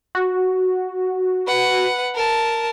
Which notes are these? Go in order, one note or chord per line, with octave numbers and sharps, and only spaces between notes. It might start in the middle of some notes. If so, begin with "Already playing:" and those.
F#4
B4 F#5
A#4 A5